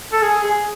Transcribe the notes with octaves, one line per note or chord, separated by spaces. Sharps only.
A4
G#4
G#4